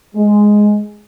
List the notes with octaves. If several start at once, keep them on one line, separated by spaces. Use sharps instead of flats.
G#3